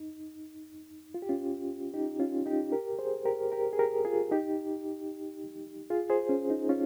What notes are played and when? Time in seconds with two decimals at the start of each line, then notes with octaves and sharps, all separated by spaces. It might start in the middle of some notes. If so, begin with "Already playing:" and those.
Already playing: D#4
1.14 F4
1.22 G4
1.29 C#4 F4
1.94 D#4 G4
2.20 C#4 F4
2.46 D#4 G4
2.72 G4 A#4
2.99 G#4 C5
3.25 G4 A#4
3.52 G4 A#4
3.73 G#4
3.79 G4 A#4
4.05 F4 G#4
4.31 D#4 G4
5.90 F4 G#4
6.10 G#4 C5
6.29 C#4
6.50 D#4
6.69 C#4 F4